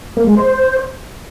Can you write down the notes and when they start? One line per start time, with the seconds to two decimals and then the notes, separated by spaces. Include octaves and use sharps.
0.17 A#3
0.27 G#3
0.37 C5